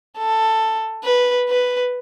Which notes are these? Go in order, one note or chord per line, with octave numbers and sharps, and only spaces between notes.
A4
B4
B4